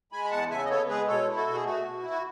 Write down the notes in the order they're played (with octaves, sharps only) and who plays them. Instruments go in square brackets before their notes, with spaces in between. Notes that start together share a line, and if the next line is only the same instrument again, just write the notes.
[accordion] G#3 G#5 B5
B5
E2 F#5 A5
C#3 E5 G#5
D#5
B3 A4 C#5
G#3 G#4 B4
B2 A4 C#5
E4
F#4 A4
B2
G#4
A3 F#4
B2
E4
F#4